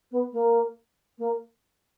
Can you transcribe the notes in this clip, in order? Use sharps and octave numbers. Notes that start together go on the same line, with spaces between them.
B3
A#3
A#3